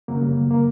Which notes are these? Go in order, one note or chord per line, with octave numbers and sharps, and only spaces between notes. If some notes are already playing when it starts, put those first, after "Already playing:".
F#2 C#3 F#3 A#3
G3
A#3